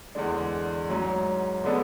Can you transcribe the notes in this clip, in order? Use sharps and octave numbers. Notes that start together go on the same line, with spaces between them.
E2 D3 G#3 D4
G#2 F#3 C#4
D3 G#3 B3 D4 A4